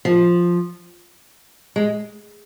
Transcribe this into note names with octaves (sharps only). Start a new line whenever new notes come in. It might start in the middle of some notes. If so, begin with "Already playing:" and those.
F3
G#3